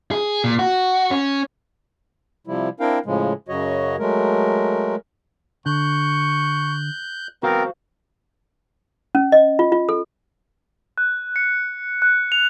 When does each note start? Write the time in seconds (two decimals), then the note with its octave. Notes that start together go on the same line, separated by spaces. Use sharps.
0.11 G#4
0.44 A#2
0.59 F#4
1.11 C#4
2.47 C3 F3 G3 E4
2.80 C4 D4 E4 A#4 F5 G5
3.06 A2 C#3 F3 G#3
3.48 F#2 C#3 F#3 F#4 C#5 D#5
3.99 F#3 G#3 A3 A#4
5.66 D3 C#6 F#6 G6
7.43 B3 C4 F#4 A#4 C5 F5
9.15 C#4
9.32 D#5
9.59 F4
9.72 F4
9.89 A4
10.98 F#6
11.36 C#7
12.02 F#6
12.32 F7